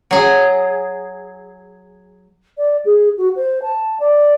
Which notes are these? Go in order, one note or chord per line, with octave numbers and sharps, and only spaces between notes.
F#3 G#4
D5
G#4
F#4
C5
A5
D5